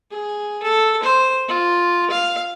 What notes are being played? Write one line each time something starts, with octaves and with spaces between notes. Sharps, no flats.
G#4
A4
C5
F4
F5